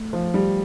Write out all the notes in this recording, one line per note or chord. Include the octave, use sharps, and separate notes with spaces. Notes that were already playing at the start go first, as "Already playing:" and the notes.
Already playing: A3
F3
G3